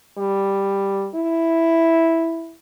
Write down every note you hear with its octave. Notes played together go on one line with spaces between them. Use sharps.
G3
E4